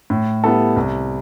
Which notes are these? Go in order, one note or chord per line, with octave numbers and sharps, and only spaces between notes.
A2
G3 B3 E4 A4
C2